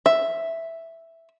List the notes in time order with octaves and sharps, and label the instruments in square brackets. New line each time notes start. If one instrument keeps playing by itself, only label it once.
[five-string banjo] E5